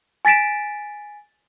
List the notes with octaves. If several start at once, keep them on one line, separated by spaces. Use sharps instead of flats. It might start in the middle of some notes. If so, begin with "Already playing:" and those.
G#5 A6 B6 D7 E7